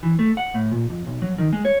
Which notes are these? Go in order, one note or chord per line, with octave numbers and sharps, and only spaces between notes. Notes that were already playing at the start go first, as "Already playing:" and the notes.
E3
A3
F#5
A2
A#2
F2
B1
F#3
D#3
G#3
C#5